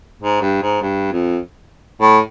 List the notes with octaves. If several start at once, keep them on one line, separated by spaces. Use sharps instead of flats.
G#2
G2
G#2
G2
F2
A2